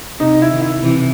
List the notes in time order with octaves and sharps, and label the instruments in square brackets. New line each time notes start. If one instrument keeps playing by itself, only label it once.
[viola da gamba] C3 [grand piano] D#4
[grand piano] E4
[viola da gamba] D#3
[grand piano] E4
[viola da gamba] C3 E3